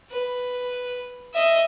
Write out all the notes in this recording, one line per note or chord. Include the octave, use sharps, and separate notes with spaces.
B4
D#5 E5